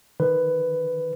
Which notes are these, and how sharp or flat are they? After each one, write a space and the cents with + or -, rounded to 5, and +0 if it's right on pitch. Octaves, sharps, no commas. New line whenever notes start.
D#3 +0 B4 +10